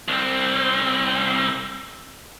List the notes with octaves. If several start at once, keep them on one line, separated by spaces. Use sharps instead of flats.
C2 C4